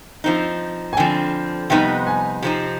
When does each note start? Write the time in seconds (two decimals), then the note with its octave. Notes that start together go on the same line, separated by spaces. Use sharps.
0.24 F3 C4 D#4
0.93 G#5
0.97 F2 D3 F3 C4 G5
1.70 F2 C3 G3 B3 D#4 G5
2.07 G#5
2.42 C3 F3 C4 D#4